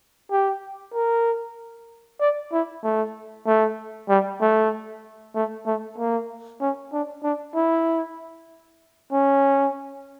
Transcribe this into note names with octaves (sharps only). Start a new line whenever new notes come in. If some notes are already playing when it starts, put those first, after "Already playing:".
G4
A#4
D5
E4
A3
A3
G3
A3
A3
A3
A#3
C#4
D4
D4
E4
C#4